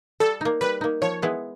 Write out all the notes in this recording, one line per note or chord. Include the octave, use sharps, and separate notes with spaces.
G3 A4
A#3 D#4
G3 B4
A#3 D#4
F3 C#5
G#3 B3 E4 G#4